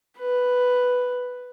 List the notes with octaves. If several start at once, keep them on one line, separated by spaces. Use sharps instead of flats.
B4